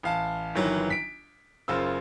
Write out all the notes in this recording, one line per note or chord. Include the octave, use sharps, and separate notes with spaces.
A1 F5 A5
G1 D#3 E3 F#3
B6 D7
F#1 C#3 F4 C5 E6